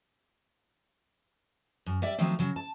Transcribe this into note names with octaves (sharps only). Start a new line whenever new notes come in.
F#2
G3 D5 E5
D#3 F3 F#3 A3 C4
C#3 F#3
A5